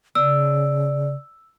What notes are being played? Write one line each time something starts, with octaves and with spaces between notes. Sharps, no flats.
C#3 D5 E6